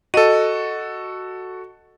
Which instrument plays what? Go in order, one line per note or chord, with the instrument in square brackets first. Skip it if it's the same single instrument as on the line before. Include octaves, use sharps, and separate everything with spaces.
[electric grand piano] F#4 A4 [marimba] D#5